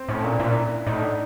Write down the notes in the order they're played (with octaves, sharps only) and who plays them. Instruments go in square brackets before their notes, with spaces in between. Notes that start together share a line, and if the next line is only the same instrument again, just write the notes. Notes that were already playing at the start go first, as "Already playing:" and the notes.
Already playing: [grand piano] C4
[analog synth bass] A2 [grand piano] C#4
[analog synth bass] A#2 [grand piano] D4
[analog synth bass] A#2 [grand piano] E4
[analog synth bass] A2 [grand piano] D#4
[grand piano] D4